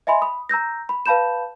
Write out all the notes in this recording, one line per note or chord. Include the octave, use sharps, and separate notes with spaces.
D#5 E5 G#5 B5 C6
B5 D#6
A#5 E6 G6 A#6
B5
B4 F5 A5 B5 G6 E7